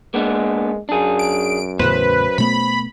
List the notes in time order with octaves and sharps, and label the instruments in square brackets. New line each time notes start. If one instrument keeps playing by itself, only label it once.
[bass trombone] G#3 [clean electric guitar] A#3 B3 D4
[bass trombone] F#2 [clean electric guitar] D4 G#4
[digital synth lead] D7
[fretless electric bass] E2 A2 C#3 [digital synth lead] B4 [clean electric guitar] C5
[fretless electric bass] B2 A3 B3 [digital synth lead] B5